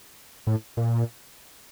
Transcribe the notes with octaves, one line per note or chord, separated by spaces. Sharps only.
A2
A#2